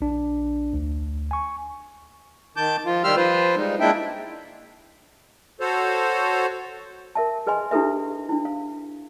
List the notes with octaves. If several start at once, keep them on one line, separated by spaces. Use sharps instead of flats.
A#1 D4
D2
G#5 C#6
D#3 A5 D6 G6
F3 F4
D#3 G3 G4 C6 E6 F6
F3 F4 B4 C5
G3 G#3 D#4
G#3 A#3 D4 E4 E5 G5
F#4 A4 C5 C#5
A#4 E5 A5
G#4 B4 D#5 G#5 C6
D4 E4 G4 A4 B4 E5
D4 E4
F5